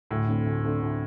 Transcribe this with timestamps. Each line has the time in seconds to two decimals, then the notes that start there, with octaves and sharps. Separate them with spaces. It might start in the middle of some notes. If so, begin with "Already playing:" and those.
0.10 D2 A2
0.28 D3 A3 C4
0.46 D2
0.64 D3 A3 C4
0.81 D2